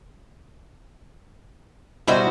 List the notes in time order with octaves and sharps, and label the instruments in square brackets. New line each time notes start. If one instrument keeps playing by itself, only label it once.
[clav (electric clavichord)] B2 G3 E4 [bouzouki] D#4 F#4 C5